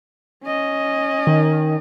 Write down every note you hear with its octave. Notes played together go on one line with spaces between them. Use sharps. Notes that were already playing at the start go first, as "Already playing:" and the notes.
C#4 D#5
D#3